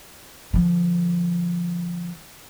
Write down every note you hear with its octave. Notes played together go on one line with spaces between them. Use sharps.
D3 F3